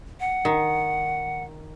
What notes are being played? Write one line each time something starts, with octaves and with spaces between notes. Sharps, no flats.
F#5
D#3